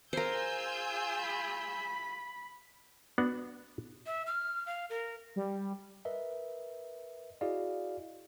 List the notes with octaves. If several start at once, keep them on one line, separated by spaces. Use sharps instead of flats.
F4 G#4 A#4 C5 G#5 E6 G6
B5
B3 D4 F#4 F#5
E5
F6
F5
A#4
G3
A#4 B4 D#5 E5
E4 F#4 G#4 D5 D#5 F5